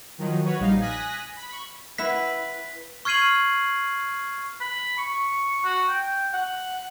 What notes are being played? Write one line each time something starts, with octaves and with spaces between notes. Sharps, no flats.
D#3 F3 F#3 D#4
F#4 B4 C#5
A#1 G3 D#4 F5
G#5 D#6 F#6 A#6 B6
B5
B5 C#6
E4 B4 E5 F#5 B6
C#6 F6 G#6 C7 D#7 F#7
B5
C#6
F#4
G5
F#5